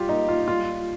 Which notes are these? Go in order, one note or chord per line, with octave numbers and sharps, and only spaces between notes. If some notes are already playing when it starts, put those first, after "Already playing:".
Already playing: G3 F4 G4
A#3 D#4
F4
G3 F4